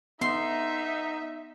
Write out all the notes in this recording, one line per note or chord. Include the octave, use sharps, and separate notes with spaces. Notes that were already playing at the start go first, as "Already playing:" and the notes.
B3 D#4 E5 C6